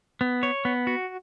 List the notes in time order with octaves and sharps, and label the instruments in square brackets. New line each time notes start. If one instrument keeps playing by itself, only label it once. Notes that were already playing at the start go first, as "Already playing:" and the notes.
[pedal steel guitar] B3
C#5
B3
F#4